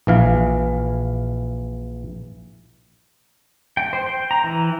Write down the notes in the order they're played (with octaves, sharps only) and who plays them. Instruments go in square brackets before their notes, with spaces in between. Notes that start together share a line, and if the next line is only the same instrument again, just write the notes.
[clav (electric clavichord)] A#1 E3 F5
[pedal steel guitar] G5
C5
G5
A#5
E3